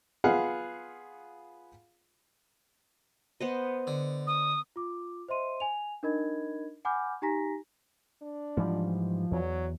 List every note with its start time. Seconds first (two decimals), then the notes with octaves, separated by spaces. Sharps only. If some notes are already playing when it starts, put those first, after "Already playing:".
0.24 B3 F4 G#4 F5 F#5
3.40 B3 C5 D#5
3.87 D3
4.27 D#6
4.76 F4 D6
5.28 C5 D#5 E5 C6 D#7
5.60 G#5 F7
6.03 D4 D#4 A#4 D#5 B5 G#6
6.85 F#5 G#5 B5 D6 F6 G6
7.22 D#4 G4 G#5 A#5 A#6 B6
8.23 D4
8.57 G#2 E3 F3 G3
9.31 E2 F#3